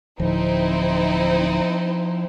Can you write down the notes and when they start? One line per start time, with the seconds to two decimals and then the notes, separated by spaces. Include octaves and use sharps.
0.20 D1 F3 C4 D#4 E4